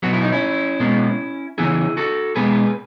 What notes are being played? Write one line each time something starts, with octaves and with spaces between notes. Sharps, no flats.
B2 F#3 B3 F#4
E4
D#4
C#4 E4
B2 G#3 B3
C#3 E3 B3 E4 G#4
F#4 A4
B2 G#3 B3 G#4 B4